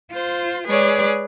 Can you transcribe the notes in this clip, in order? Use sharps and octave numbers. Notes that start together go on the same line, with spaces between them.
F4 C5
G#3 G#4 B4 C#5 D5